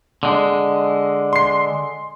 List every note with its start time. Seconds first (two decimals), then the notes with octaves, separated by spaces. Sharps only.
0.23 D3 G#3
1.33 C6 C7